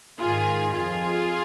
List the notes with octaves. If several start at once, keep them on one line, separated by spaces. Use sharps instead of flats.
G#2 D#3 F4 G#4
F2 F4 G#4